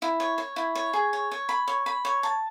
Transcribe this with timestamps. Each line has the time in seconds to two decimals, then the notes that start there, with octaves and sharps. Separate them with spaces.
0.02 E4
0.20 C#5
0.38 C#5
0.56 E4
0.75 C#5
0.93 G#4
1.13 C#5
1.31 C#5
1.49 B5
1.68 C#5
1.86 B5
2.05 C#5
2.23 A5